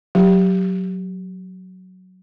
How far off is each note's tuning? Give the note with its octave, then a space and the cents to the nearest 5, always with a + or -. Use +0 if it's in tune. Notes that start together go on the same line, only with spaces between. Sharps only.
F#3 +0 G4 +5